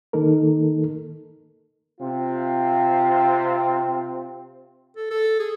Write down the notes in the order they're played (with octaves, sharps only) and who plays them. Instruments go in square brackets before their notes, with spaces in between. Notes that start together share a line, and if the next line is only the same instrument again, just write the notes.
[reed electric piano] D#3 A#3 D#4 A4 A#4
[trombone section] C3 C4 F4
[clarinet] A4
A4
G#4